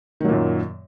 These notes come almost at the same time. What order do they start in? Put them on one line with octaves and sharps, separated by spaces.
D#3 F#3 A#2 F#2